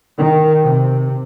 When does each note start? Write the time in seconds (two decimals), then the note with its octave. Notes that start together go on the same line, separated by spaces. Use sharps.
0.15 D#3
0.64 C3